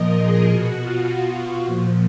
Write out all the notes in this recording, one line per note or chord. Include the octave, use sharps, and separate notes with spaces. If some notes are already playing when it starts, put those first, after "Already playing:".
Already playing: A#2 F3 A#4 D#5
G#4
B2 F#4
F4
A#2 F3